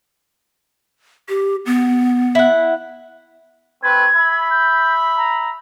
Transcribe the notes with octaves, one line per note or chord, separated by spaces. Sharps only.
G4
B3
E4 F#5
A3 C4 B4 G#6
E5 B5
G6
A#5